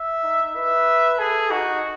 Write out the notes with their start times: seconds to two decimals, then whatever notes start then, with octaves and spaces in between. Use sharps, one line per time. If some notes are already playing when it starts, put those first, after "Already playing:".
Already playing: E5
0.24 D#4
0.56 B4 E5
1.19 G#4 A4
1.51 D#4 F#4